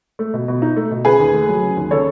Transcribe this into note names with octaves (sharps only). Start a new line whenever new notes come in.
A3
B2
B2
D#4
A3
B2
C#3 G#4 B4
D#2
A3
F#3
C#3
D#2
C#3 A4 C#5